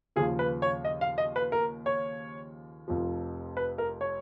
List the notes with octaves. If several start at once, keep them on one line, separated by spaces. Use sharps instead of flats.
D#2 C#3 F3 G#4
B4
C#5
D#5
F5
D#5
B4
A#4
C#5
F1 F2 F3
B4
A#4
C#5